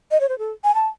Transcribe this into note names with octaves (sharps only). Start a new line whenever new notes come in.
D#5
C#5
C5
A4
G#5
A5